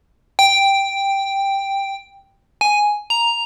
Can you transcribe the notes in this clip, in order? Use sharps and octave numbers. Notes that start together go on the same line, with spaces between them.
G5
G#5
A#5